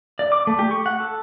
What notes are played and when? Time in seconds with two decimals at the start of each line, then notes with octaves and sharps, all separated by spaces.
0.19 D5
0.32 D6
0.47 A3
0.59 G4
0.71 C#6
0.86 F#5
1.00 A4